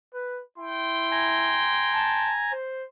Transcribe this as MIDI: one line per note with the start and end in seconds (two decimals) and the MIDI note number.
0.14 0.41 71
0.58 1.67 64
0.58 2.37 79
0.58 2.37 84
1.12 2.52 80
1.12 2.52 82
1.94 2.33 81
2.52 2.85 72